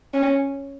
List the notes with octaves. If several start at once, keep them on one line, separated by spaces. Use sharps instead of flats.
C#4